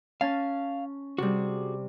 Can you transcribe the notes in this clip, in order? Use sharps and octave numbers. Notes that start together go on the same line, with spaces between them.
C#4 F5 G#5 A5
C3 G3 F#4 G#4